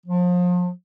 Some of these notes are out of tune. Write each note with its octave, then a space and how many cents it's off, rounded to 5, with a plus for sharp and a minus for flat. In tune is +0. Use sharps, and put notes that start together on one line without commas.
F3 +35